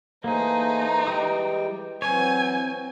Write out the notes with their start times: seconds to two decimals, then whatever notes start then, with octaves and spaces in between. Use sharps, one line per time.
0.24 E3 A3 A#3 D#4 G#4 C5
1.07 E3 G3 G#3 G5 D#6
2.02 E3 F#3 C4 C#5 G#5